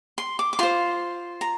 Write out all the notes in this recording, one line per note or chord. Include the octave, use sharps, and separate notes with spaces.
C6
D6
D6
F4 C5 C6
A#5